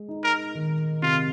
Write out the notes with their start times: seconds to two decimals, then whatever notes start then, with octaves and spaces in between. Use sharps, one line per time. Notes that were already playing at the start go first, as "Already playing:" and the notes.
Already playing: G#3
0.09 D#4
0.24 A#4
0.55 D#3
1.02 C3 F4